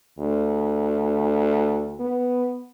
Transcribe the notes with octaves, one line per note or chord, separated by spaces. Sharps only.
D2
B3